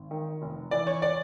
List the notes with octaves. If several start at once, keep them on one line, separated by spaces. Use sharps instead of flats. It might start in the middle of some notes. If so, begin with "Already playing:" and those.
Already playing: G#1
D#3
F1
E3 D5
C#5
D5